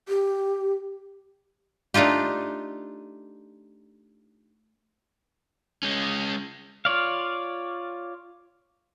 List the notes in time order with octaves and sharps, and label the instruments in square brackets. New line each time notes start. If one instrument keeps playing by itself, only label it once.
[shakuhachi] G4
[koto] A3 D4 D#4 F4 G4
[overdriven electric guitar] G#3 C#4
[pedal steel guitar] F4 C#5 D5 F5